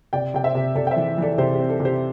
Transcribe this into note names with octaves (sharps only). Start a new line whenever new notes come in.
C3 D5 G5
C3 G5
C5 E5
C3
C3 A4 D5
G5
C5 E5
E3
E3 A4 D5
C3 G4 C5
G4
C4
A4
C3
G4 C5